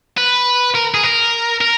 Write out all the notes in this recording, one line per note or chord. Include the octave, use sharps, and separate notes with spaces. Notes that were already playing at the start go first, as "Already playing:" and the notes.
B4
A#4
G#4
A#4
A#4